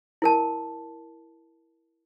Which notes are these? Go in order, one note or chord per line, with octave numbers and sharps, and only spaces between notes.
E4 A#4 A5